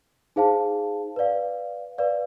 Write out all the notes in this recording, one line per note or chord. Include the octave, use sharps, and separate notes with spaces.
D#4 G#4 C5 F5 A5
B4 D5 F5
B4 D5 F5